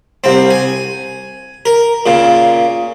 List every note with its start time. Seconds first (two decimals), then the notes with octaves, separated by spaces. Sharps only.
0.24 C2 C4
0.50 G#5
1.66 A#4
2.06 A#2 C#3